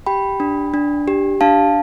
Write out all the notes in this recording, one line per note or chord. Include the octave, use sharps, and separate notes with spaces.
G4 G5 B5
D4
D4
G4
D4 F5 A5